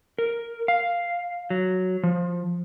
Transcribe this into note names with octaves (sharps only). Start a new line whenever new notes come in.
A#4
F5
F#3
F3